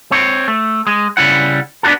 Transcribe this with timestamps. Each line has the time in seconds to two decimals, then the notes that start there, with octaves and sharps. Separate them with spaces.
0.11 C4 C#5
0.48 A3
0.87 G#3
1.17 C#3 G3 E4 F#5
1.83 B3 D4 F4 F#4 A4